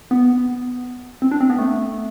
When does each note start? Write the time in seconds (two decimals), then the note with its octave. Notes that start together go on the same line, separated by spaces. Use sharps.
0.11 B3
1.22 C4
1.31 D4
1.41 C4
1.50 B3
1.58 A3